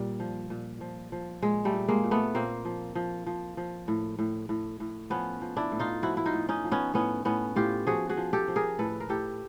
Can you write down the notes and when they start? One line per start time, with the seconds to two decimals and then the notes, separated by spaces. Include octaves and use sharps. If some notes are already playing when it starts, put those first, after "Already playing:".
Already playing: A#2 G3
0.20 F3
0.50 A#2
0.81 F3
1.12 F3
1.42 A#2 G#3
1.65 G3 A3
1.73 A#2
1.88 G#3 A#3
2.04 A#2
2.11 A3 B3
2.34 A#2 A#3 C4
2.65 F3
2.95 F3
3.26 F3
3.57 F3
3.88 A2
4.19 A2
4.49 A2
4.80 A2
5.10 F3 B3 C#4
5.41 F3
5.57 D4 E4
5.72 A2
5.79 D#4 F4
6.02 F3 E4 F#4
6.17 E4
6.26 D#4 F4
6.33 A2
6.49 C#4 D#4
6.64 F3
6.71 B3 C#4
6.94 A2 B3 C#4
7.25 A2 B3 C#4
7.56 A2 F4 G4
7.87 F3 F#4 G#4
8.09 F#4 G#4
8.17 F3
8.33 G4 A4
8.48 F3
8.56 G#4 A#4
8.79 A2 A4 B4
9.00 A#4
9.09 A2 G4 A4